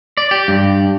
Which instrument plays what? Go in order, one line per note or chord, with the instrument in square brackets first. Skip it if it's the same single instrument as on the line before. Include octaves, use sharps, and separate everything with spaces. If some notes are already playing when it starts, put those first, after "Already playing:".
[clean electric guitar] D5
G4
G2